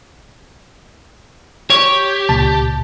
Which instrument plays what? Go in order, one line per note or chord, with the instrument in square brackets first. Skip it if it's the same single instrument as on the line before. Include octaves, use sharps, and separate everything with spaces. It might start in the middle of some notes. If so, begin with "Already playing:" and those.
[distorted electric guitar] G4 [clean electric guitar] C#5
[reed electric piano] C#2 A#2 [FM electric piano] A5